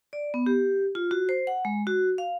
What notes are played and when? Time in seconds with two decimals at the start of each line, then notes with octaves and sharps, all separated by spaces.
0.13 D5
0.34 B3
0.46 G4
0.95 F4
1.11 F#4
1.29 C5
1.47 F#5
1.65 G#3
1.87 F#4
2.18 F5